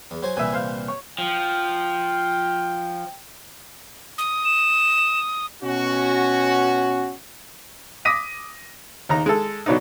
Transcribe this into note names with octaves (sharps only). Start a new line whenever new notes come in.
E2
F#3 C5 G#5
C2 A#2 E3 E5 G#5
C5 F5
C#5
F3 G5
D#6
E7
B2 C#4 F#4
D6 D#6 A#6 B6 D#7
D#2 D#4 A#5
G#3 A4
B2 F#3 B3 D4 D#4